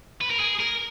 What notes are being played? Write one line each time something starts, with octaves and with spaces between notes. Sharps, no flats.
B4
A#4
G#4
A#4